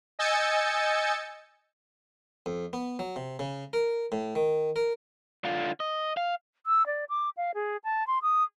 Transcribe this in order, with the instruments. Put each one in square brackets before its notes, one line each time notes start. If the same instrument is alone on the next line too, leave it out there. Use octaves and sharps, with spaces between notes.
[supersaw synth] D#5 G#5 E6 G6 A6 C#7
[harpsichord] F2
B3
F#3
C3
C#3
A#4
A2
D#3
A#4
[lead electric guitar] D3 F4
D#5
F5
[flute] E6
D5
D6
F5
G#4
A5
C6
D#6